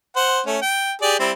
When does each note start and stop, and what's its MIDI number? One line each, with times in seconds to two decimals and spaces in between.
0.16 0.41 72
0.16 0.41 78
0.46 0.57 57
0.46 0.57 61
0.62 0.92 79
1.02 1.19 67
1.02 1.19 68
1.02 1.19 74
1.20 1.32 55
1.20 1.32 60
1.20 1.32 64